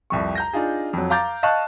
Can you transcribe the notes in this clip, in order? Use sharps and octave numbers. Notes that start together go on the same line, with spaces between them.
C2 F2 C#6
A#5 G6 A#6
D4 D#4 F4 G#4
F2 F#3
F5 A#5 D6 G6 A6
D#5 F5 A5 C#6 F#6